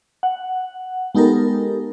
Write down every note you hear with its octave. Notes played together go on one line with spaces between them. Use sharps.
F#5
G#3 B3 D#4 G4 A4 A#4